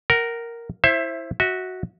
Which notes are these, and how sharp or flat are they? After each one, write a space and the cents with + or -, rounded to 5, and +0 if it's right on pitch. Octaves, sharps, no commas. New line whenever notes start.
A#4 +0 F#5 +30
E4 +0 C5 +25 E5 +15
F#4 +0 E5 -30